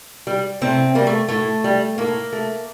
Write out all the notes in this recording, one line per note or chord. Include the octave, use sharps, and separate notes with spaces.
G3
A2 C3 C4
G3 A#3
A3
A2 A3
G3
A2 A#3
A3